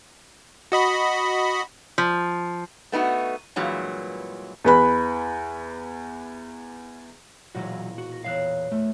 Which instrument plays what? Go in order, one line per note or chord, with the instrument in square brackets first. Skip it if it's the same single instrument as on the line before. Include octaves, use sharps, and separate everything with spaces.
[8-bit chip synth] F#4 D#5 B5
[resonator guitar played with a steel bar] F3
A3 B3 D#4 E4 F#4
G2 A#2 E3 F#3 G#3
[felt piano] E2 B4 B5
[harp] E1 A#2 A#6 [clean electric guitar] E3 F#3 F#4
[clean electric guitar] F#4
[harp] A#6
[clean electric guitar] E2 D#3 F5 [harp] C#5 F#6
[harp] E2 [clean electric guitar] A3